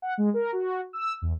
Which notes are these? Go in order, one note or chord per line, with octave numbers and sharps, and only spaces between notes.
F#5
G#3
A#4
F#4
E6
E2